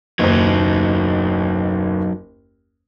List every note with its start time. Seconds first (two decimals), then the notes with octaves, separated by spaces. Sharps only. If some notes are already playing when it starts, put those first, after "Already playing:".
0.19 F#1 D#2 F#3 D#4